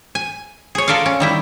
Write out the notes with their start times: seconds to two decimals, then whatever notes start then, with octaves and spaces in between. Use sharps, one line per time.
0.15 G#5
0.75 G#4 C#5
0.88 F4 A4 A#4 D5 F5
1.06 C#4
1.20 D#3 G3 E4